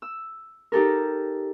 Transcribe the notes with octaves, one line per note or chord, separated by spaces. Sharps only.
E6
D#4 G4 A4 A#4